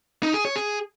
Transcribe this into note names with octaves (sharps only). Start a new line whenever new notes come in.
D#4
G#4
C#5
G#4